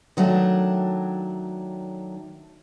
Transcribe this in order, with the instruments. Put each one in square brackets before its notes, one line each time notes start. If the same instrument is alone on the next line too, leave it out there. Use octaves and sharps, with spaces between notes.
[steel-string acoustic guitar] D#3 F#3 A3 D4